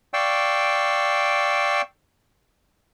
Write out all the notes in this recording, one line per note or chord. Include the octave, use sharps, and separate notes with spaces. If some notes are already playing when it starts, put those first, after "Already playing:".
D5 F5 G5 C#6 E6